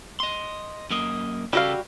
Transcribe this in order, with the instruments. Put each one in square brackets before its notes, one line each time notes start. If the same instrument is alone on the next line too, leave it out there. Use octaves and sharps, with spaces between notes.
[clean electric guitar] D#5 C6
F#2 A#3 D#5
[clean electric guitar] C#3 G4 A4 [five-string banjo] G3 F#4 F5